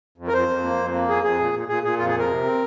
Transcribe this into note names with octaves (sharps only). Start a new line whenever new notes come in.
F2
A#4
F2 C5
F2
A#3
F2
A#3
F2 G#4
F2 G#4
A#2
A#2
A#2 G#4
A#2 G#4
F2 F4
G#4
F2 A#4
C3
C4